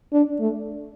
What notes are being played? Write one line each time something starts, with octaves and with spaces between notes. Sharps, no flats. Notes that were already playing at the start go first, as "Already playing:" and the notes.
D4
A3